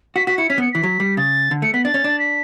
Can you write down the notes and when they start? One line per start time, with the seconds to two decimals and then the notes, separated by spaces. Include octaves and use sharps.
0.16 F#4 B6
0.27 F#4 B6
0.38 E4 C#7
0.49 C#4 B6
0.58 B3 C#7
0.72 E3 B6
0.84 F#3
1.00 G3
1.17 C#3 A6
1.51 D3
1.62 A3 C#7
1.73 B3 B6
1.84 D4 A6
1.94 C#4
2.04 D4
2.19 B6